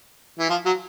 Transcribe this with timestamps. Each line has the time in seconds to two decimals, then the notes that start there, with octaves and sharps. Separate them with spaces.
0.39 E3
0.50 F3
0.66 F#3